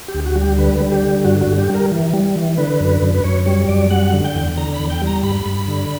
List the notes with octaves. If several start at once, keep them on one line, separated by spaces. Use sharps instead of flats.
G4
D2
F#4
G3
G4
D3 B4
G3
G4
D3
G2 F#4
F#4
G2
G4
G3 A#4
E3
G3
E3
D3 B4
F#2
F#2
B4
F#2 C#5
G3 C#5
F#2 D5
G3 F#5
D3
G5
E2
D3 A#5
B5
E2
G5
G3
A#5
G2 B5
G2
D3